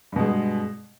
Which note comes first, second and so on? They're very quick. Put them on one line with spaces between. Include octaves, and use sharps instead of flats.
G2 B2 G#3